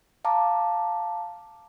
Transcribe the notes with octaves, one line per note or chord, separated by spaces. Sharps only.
F5 A5 A#5 D6